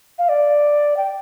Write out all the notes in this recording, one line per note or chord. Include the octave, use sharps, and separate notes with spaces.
F5
D5
G5